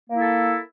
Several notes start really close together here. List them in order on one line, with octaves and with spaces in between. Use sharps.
A#3 E4 A4